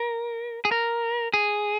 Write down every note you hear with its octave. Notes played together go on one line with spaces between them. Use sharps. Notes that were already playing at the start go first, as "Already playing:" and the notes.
Already playing: A#4
G#4
A#4
G#4